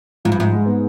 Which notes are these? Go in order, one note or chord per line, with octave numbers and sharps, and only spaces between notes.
G#2 F3
G2
G#2 F3
G#3
B3